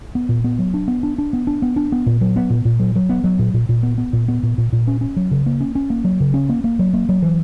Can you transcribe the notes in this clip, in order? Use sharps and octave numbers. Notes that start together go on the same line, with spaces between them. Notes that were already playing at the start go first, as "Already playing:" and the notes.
B3
A#2
B3
F#3
D4
B3
D4
D4
B3
D4
B3
D4
B3
A#2
F#3
B3
A#2
A#2
F#3
F#3
B3
F#3
A#2
A#2
A#2
B3
B3
A#2
B3
A#2
A#2
A#2
C#4
C#4
F#3
C#3
A#3
C#4
C#4
A#3
F#3
C#3
C#4
A#3
A#3
F#3
A#3
F#3
E3